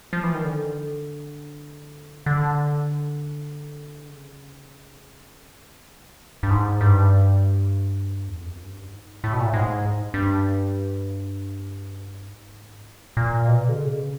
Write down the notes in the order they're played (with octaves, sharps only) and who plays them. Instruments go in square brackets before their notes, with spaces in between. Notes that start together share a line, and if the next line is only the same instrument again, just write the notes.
[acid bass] F3
E3
D#3
D3
D3
C#3
B2
G2
G#2
G2
E2
F2
F#2
G2
G#2
A2
B2
A#2
A2
G#2
G2
G#2
A#2
B2
D3
C#3